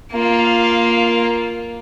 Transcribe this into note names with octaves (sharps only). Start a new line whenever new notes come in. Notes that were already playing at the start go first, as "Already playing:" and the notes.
A#3 F4